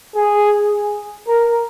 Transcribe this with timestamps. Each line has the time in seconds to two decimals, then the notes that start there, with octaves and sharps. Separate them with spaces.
0.15 G#4
1.27 A#4